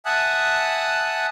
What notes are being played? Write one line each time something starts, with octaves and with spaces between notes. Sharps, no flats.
E5 F#5 G#5 A5 D#6 F#6